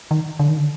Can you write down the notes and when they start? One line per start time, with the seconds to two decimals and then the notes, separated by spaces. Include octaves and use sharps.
0.11 D#3
0.39 D3
0.48 D#3
0.57 D3